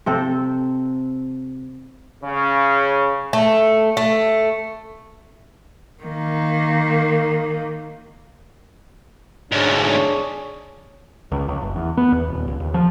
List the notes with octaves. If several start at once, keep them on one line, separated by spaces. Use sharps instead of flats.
C3 C4 A4
C#3
A3
A3
D#3 A#3
D2 G#2 D4 G#4 C#5
C#2
C#2
F#1
E2
B3
E2
D#1
C#2
D#2
F3